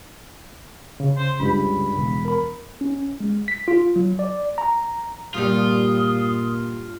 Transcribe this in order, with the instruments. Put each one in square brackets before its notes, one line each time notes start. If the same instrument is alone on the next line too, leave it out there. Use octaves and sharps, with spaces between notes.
[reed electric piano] C#3
[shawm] C5
[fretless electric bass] C#2 G2 [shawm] B5
[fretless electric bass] E1
[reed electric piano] A#4 B5
[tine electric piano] C#4
G#3
B6
F4
F#3
D5
A#5
[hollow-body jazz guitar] G2 G3 [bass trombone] A#2 [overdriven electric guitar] F4 [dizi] D#6